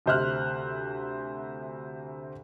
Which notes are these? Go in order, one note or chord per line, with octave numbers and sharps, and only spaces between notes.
D2 C3 C5 E5 F6 F#6